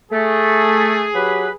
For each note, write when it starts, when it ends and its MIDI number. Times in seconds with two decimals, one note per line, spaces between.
0.12 1.08 57
0.12 1.56 68
1.15 1.50 54
1.15 1.50 67
1.15 1.50 71